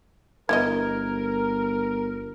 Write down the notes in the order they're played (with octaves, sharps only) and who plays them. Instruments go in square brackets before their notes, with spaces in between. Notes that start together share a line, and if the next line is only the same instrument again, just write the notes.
[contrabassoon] G1 [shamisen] E3 B3 D#5 [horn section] A#4 [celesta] G#6